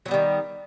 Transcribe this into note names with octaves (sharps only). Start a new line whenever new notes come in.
D#3 F#3 G3 B3